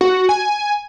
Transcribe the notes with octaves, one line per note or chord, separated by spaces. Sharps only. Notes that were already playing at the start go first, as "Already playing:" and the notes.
F#4
G#5